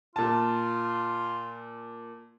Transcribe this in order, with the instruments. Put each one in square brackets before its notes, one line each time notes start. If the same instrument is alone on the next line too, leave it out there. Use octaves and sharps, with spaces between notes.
[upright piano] A#2 A5 [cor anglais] F4